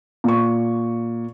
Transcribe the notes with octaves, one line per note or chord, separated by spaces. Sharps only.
A#2 C#6